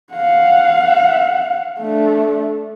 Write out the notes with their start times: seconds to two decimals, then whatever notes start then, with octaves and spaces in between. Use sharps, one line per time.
0.14 F5 F#5
1.80 A3 D4